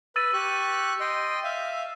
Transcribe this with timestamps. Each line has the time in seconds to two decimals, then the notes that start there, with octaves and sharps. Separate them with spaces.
0.16 B4 E6 A6 D#7
0.33 G4 C#6 F#6
1.00 D#5 G5 C6
1.44 E5 F5